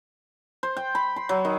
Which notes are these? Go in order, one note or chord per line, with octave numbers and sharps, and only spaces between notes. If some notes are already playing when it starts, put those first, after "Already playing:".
C5
G5
B5
C6
F#3
D#3